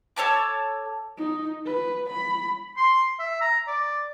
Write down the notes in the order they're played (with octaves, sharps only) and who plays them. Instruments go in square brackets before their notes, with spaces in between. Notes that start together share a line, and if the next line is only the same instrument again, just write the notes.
[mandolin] A4 C#5 A5 D6
[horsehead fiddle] D#4
B4
B5
[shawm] C6
E5
A#5
D5